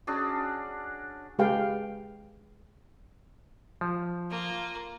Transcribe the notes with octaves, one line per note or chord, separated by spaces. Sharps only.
C#4 D4 F#4 G#4
G#3 G4 G#4 B4 F5 G5
F3
A#3 F4